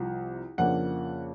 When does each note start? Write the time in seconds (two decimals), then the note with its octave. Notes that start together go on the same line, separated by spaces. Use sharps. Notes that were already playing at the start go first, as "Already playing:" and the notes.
Already playing: C2 C3 F3
0.58 F2 C#3 F3 A#3 D4 F#5